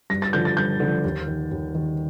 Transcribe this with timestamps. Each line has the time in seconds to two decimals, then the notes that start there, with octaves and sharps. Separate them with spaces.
0.10 G2 A#6
0.22 A6
0.33 D3 F3 G6
0.45 A6
0.57 G2 G6
0.80 D3 F3
1.04 D#2
1.27 D#3
1.51 D#2
1.75 D#3